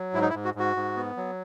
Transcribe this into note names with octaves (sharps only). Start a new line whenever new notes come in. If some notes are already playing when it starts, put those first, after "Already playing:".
Already playing: F#3
G#2 E4
D#4
E4
G#2
F#4
G#2 F#4
G#2
B3
F#3